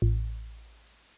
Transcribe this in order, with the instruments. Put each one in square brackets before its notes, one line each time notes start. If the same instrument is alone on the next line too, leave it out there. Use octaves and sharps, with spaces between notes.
[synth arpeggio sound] A1